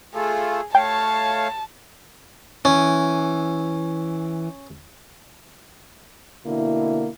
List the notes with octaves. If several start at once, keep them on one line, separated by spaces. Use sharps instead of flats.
A3 F4 G#4 A4
A3 C#5 F5 G5 A5
E3 C#4
B2 D3 A#3 E4